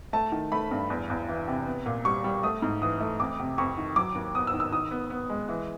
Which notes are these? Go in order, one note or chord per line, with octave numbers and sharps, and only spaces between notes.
A3 A5
D#3
A3 B5
G2
E2
E2
E3
C3
B3
A#2
G3 C#6
G3
A3 D#6
G#2
E3 D#6
A3
F2 D6
C3
F2 C#6
D#3
F#3 D6
D#2
B3 D#6
E6
D#3
E6
D#3 D#6
B3
B3
G#3
E3